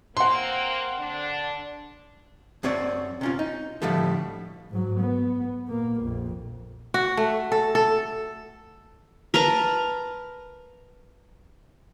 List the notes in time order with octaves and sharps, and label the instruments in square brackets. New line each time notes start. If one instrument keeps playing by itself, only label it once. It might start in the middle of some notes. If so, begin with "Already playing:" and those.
[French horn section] A#3 C4 [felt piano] F#5 C6
[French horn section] D3 D4
[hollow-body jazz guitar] F#2 C4 C#5 D5
C3 C#4 F4
D#4
A2 D3 F3 G3 A3
[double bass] G#2 F#3
B3
A#2 A#3
A#1 F2
[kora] F#4
A3
A4
A4
[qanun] A#4 B4 A5 A#5